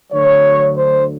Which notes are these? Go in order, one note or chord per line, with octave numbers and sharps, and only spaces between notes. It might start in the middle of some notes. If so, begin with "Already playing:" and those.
D2 D3 F#3 C#5
C5